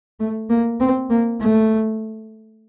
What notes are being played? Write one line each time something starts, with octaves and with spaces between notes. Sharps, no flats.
A3
A#3
C4
A#3
A3